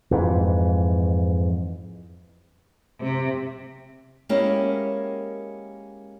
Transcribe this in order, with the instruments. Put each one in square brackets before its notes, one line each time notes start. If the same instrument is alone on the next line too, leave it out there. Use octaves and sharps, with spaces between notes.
[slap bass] F2 G#2 E3
[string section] C3
[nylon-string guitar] G#3 A#3 C#4 E4 G4 A#4